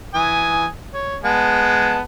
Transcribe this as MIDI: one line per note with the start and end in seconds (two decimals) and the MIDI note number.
0.14 0.67 52
0.14 0.67 80
0.14 0.67 87
0.94 1.17 73
1.24 2.00 56
1.24 2.00 59
1.24 2.00 81